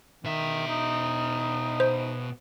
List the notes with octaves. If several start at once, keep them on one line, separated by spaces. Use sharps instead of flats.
B2 D#3 E5
D#4
C5